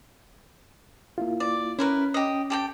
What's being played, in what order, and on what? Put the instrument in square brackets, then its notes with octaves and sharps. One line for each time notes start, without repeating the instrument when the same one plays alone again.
[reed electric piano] A#3 E4 F4
[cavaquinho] D5
[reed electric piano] C#4 [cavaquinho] E4 A#4 B4
[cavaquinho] G4 D#5
G4 A4 G5